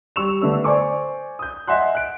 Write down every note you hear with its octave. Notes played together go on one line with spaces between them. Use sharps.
G3 C#6 E6 E7 F7
D3 A3 B3 D4 E6
C5 D5 G#5 C#6 D6
D#6 G6
D#5 E5 F#5 G#5 C6 F#6
F#6 D7